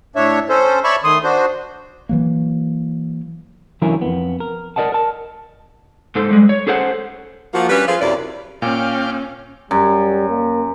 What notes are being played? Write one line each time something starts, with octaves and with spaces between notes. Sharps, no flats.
A2 D4 C#5 E5
C#4 A4 C5
C#5 D5 E5 A5 B5 C#6
D#3 A3 C6 D#6
D4 F#4 C5
E3 F#3 A#3
D3 E3 F#3 C#4 E4 A#4
F2 B3
A#4
A#4 D5 D#5 F#5 A5
A#4 A5
G#2 A4 C5
G3 G#3
C#5
C#4 G#4 A4 C5 F#5
F3 A#3 F#4
G3 C#4 D4 B4
F3 F4 G#4 A4 B4 F5
F#2 C3 F#3 E4 D5
A#2 C#4 F5 G5 D6
F#2 G3
A#3